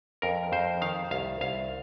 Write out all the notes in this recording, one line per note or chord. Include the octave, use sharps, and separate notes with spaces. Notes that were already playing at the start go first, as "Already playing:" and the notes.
F2 A#4
F2 C5
D#3 F5
C2 F5
C2 F5